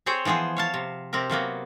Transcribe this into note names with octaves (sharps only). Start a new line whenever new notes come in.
C4 G#4 C5 C#5 G5
E3 F3 B3 G#4 C5
C#5 F5 A5
C3
C3 C4 G4 A#4
C3 F#3 A#3 B3